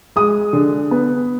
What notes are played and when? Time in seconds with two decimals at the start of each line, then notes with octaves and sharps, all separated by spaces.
0.16 G#3 D#6
0.53 D3
0.91 B3